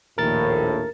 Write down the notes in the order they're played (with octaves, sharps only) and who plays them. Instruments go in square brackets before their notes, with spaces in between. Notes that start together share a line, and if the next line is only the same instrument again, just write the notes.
[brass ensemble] A#1 D#2 A2 [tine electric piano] A#4 A6